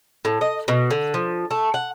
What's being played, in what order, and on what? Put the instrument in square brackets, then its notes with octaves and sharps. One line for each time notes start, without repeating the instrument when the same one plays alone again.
[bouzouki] A2
D#5
B2
D3
F3
A3
F#5